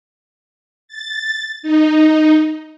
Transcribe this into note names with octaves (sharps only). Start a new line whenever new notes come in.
A6
D#4